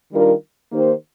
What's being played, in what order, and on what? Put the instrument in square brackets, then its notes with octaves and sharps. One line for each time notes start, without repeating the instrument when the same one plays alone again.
[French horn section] D#3 G3 D4 F4 A#4
D#3 A#3 D#4 G4 C5